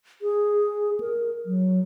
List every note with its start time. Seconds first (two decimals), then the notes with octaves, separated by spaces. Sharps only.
0.22 G#4
1.00 A#4
1.46 F#3